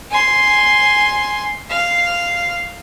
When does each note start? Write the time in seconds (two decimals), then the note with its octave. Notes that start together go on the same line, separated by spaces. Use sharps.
0.11 G#5 C6
1.70 F5